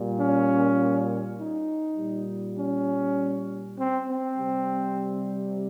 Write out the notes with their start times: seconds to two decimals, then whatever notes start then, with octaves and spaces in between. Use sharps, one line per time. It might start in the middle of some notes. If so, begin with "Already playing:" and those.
Already playing: A#2 G3
0.18 C#4
1.37 D#4
1.97 A#2 G3
2.57 C#4
3.77 C4
4.07 C4
4.36 C3 G3